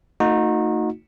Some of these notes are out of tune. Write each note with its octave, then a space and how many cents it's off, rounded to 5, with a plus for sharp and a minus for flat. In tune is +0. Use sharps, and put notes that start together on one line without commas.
A3 +35 D#4 +0 F#4 -35